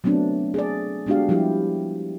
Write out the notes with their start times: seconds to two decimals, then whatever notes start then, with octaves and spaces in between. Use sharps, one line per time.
0.04 F#3 A3 B3 C4 D4
0.54 G#4 A4 D5
1.07 G#3 B3 D4 F#4 G4 F5
1.29 F3 G3 D4 E4 G4